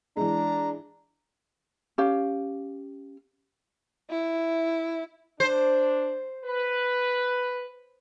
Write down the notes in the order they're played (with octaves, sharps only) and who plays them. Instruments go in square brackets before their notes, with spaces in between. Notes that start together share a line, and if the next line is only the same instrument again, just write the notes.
[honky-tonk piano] E3 G#3 [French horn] D4 [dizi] A#5
[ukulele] C#4 G4 F5
[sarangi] E4
[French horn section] D4 [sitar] C5
[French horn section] B4